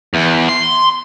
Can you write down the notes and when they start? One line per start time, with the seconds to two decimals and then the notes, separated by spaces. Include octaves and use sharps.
0.14 E2
0.49 C6